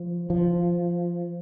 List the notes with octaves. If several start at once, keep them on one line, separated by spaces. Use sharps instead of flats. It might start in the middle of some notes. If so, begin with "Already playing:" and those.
Already playing: F3
F3